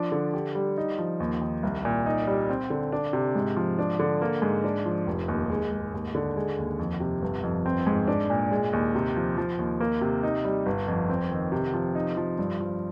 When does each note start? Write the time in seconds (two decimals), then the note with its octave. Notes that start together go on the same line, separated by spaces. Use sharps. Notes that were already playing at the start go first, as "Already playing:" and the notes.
Already playing: F3 D4
0.12 D3
0.34 G4
0.55 G3
0.78 D#4
0.98 F3
1.20 D#2
1.41 D#3
1.63 C2
1.85 A#2
2.06 D#4
2.27 G3
2.50 C4
2.70 D3
2.92 D4
3.13 C3
3.36 G#2
3.56 F3
3.79 D4
3.99 D3
4.22 A#3
4.42 G#2
4.64 D4
4.85 F3
5.07 F1
5.28 D#2
5.50 G#3
5.72 G#2
5.94 D#2
6.15 D3
6.36 G#3
6.58 D#2
6.79 F2
7.00 C3
7.22 G1
7.43 F2
7.66 C4
7.87 G#2
8.08 D4
8.30 A#2
8.51 G#3
8.73 D#2
8.95 C3
9.16 F3
9.37 F3
9.58 D#2
9.80 A#3
10.01 C3
10.23 D#4
10.45 G3
10.66 G1
10.88 F2
11.09 C4
11.31 D#3
11.52 C3
11.73 F3
11.95 D#4
12.17 F3
12.39 G2
12.60 F3